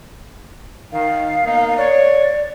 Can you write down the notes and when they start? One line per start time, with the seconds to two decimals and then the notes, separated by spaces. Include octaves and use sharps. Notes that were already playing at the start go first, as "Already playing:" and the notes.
0.92 D#3 F5
1.44 A#3 B3 D#4
1.77 C#5 D5